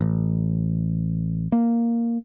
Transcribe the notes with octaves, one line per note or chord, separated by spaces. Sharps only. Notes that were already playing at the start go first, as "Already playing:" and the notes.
A1
A#3